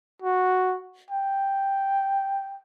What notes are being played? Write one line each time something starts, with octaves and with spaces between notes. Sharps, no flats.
F#4
G5